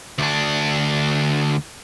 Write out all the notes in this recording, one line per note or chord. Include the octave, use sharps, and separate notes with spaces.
D2 D4